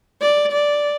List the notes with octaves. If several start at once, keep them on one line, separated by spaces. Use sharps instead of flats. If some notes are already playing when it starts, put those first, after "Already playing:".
D5
D5